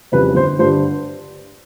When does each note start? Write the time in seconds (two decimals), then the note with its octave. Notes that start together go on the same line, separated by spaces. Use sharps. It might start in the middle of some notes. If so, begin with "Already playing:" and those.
0.12 F2 C#3 E3 G3 B4
0.35 G1 C5
0.59 G2 D3 C5